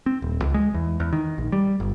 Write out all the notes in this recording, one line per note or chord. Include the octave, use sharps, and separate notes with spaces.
C4
D#1
C#2
G#3
E2
E2
D#3
A#1
G3
G1